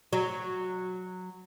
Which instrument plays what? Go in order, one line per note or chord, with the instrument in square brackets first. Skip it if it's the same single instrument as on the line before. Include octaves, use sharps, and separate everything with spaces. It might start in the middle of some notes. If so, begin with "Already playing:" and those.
[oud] F#3